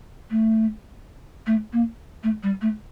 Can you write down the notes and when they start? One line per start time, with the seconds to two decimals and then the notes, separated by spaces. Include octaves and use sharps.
0.31 A3
1.46 A3
1.73 A#3
2.23 A3
2.43 G3
2.61 A3